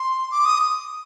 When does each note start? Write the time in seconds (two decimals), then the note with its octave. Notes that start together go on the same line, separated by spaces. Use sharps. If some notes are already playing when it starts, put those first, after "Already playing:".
Already playing: C6
0.31 D6
0.45 D#6